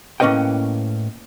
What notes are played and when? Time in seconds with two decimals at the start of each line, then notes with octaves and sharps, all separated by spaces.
0.20 A2 A#3 C#4 B4 D#5 G5